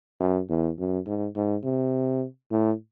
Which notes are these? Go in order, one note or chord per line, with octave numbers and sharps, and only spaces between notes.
F#2
E2
F#2
G#2
G#2
C3
A2